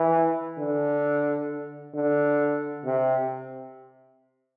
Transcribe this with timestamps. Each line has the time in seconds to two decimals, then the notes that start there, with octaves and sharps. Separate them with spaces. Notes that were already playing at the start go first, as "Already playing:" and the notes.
Already playing: E3
0.58 D3
1.94 D3
2.85 C3